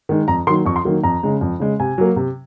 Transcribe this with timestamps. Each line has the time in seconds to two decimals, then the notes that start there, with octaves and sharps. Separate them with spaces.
0.09 D#3 G#3
0.28 F2 A#5
0.47 D#3 F#3 A#3 C6
0.66 F2 C#6
0.76 C6
0.85 D#3 F#3 A#3
1.03 F2 A#5
1.23 C#3 G#3
1.41 F2
1.60 C#3 G#3
1.80 C3 G#5
1.98 F#3 A#3
2.16 C3